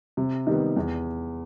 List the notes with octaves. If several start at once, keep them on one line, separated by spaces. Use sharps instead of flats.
C3
D#3 G3 B3
E2